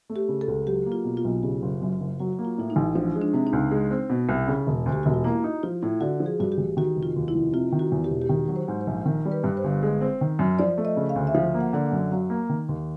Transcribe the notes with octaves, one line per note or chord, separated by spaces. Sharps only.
A3
G4
C#3
A4
C#2
F#3 G4
A#3
F4
B2
F4
B1
C#3 G4
F#1
F#2
F#1
F#3 F#4
F#4
A#3
F4
A2 E4
D#4
A1
F3 D4
G#3
D4
C3
D#4
C#2
G#3
C4
B2
C2
C#3
E1
D2
G4
E1 F#4
F4
A#3 E4
D#4
F3 F4
A2
D3 F#4
F3
G#4
G2 F#4
G4
A1
D#3 F#4
F1
F4
D#2
E4
F1
C3 F4
D#3
F#4
E2
G4
E1
G4
D#3 F#4
F#3
C5
G#2
C5
A#1
D#3 A#4
G3
B4
G2
C5
G1
G#3
C4
D#3
F#2
F3 D5
A3
D#5
C#3
F5
D2
E5
F3 F5
A#3
F#5
D3
F#5
F#2
F#3 F5
A#3
D#3
D#2